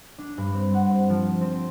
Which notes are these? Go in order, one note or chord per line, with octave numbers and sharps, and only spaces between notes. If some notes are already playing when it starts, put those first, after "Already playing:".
D4
G2
C4
F#5
C5
F3
C4